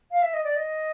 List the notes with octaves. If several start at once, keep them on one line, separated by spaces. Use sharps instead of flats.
F5
E5
D#5
D5
D#5